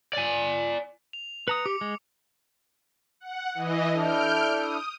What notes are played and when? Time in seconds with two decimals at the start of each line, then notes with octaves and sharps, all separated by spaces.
0.13 D5 G#5
1.13 F7
1.48 B4 A#5 D#6 C#7
1.66 G4 D6
1.81 G#3
3.20 F#5
3.55 E3 D#5
3.95 D4 E4 A4 F6 G6 D7
4.59 D#6